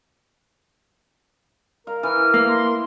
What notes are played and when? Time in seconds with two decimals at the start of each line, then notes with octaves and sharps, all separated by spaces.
1.87 A#4 F5
2.03 E3 F6
2.34 A#3
2.48 C6